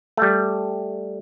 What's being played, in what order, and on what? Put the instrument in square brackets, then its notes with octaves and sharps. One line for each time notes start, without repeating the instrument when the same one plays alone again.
[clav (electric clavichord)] G3 A3